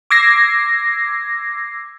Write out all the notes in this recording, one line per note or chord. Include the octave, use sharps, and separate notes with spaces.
D6 E6 G#6 A#6 C7